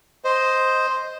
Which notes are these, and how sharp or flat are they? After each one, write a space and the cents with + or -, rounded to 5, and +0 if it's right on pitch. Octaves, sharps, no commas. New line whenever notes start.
C5 +0 D#5 +0